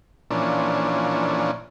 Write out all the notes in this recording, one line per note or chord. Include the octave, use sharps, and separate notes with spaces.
A#2 E3 F3 C#4 D4